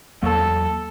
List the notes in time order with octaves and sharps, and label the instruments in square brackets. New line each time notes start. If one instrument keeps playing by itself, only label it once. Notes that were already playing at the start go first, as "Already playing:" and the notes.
[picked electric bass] E2 F#3 A#3 [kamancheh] A4